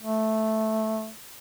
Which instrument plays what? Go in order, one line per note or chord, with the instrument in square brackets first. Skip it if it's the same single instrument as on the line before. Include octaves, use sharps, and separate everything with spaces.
[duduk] A3